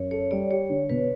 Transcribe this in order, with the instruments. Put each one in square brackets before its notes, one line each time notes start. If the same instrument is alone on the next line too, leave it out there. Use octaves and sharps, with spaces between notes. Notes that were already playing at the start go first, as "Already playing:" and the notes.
Already playing: [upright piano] F#2 [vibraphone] C#5
[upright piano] A4 [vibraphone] C#5
[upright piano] G3 [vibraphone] D5
[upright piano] G4 [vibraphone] C#5
[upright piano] D3
[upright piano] B2 [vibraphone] B4